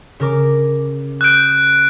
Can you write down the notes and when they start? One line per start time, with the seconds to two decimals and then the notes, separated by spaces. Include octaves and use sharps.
0.20 C#3 A#4 D6
1.21 D#6 E6 F#6 G6 D7